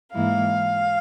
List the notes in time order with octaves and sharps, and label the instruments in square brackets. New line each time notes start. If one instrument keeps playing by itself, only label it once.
[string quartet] G#2 E3 A#3 E4 F5